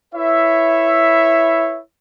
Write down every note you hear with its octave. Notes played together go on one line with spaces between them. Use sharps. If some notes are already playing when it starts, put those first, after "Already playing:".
E4 B4 C#5 E5